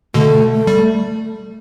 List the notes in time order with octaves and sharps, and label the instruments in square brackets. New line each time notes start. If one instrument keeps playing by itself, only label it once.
[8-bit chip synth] B2 D3 [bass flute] A3
[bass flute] A3
[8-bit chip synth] G3